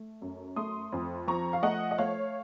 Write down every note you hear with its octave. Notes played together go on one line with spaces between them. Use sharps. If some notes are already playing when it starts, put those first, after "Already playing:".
Already playing: A3
F#2
A3 C6 D#6
F2
F3 A#5 C#6
F5
A3 D#5 F#5
D#5
A3 C#5 F5